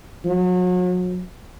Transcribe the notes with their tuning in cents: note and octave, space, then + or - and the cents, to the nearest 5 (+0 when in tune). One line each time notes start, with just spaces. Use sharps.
F#3 -35